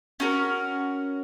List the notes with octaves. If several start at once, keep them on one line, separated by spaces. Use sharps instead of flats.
C#4 F#4 A#4